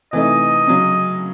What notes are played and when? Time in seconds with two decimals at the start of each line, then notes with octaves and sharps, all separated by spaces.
0.12 C3 E3 A3 D#4 D#5
0.67 C#3 F#3 C#4